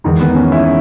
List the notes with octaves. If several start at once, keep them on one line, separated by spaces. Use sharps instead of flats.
E2 D#3 G#3 D#4
B3
C#4
E4